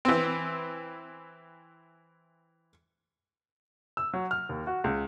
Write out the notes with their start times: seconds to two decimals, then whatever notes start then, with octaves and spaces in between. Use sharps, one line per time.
0.05 E3 C4
3.97 E6
4.14 F#3
4.31 F6
4.49 D#2
4.67 F#4
4.84 C#2